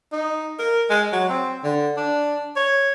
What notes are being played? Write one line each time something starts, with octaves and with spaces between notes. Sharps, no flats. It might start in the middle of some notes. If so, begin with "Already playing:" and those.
D#4
A#4
G#3
F#3
C4
D3
D4
C#5